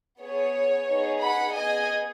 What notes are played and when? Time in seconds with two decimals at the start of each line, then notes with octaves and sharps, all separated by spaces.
0.21 B3 G#4 C#5
0.88 B3 D#4 G#4
1.21 F#5 B5
1.55 B3 G#4 D#5 G#5